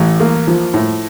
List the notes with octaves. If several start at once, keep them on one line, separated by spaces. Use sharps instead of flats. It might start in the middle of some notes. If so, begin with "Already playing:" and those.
Already playing: A1 A2
A#3
F3
A2